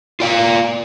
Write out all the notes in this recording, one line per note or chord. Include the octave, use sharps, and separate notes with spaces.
F4 D5 F5